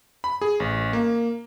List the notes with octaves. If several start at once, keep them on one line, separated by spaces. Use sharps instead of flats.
B5
G#4
A1
A#3